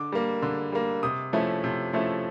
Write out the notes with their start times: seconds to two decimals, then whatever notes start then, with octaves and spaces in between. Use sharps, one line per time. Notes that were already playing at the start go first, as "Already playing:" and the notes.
Already playing: D3 D6
0.12 G3 A#3
0.42 D3
0.72 G3 A#3
1.03 C3 D#6
1.33 F3 A3 C#4 E4
1.64 C3
1.93 F3 A3 C#4 E4